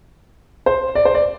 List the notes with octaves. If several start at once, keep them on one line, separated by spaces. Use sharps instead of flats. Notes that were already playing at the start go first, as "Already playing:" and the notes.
C5
D5
C5
D5